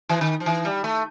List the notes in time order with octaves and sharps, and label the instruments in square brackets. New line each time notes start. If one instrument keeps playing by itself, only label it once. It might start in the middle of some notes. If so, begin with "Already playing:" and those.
[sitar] E3
D#3
F3
E3
G3
A3